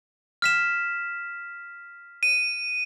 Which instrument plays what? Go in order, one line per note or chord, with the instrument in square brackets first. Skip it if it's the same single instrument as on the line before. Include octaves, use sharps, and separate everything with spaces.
[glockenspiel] F6 B6 E7
[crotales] D#7